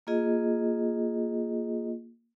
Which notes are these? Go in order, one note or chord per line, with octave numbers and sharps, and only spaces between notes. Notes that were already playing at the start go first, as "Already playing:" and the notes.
A#3 F4 G#4 D#5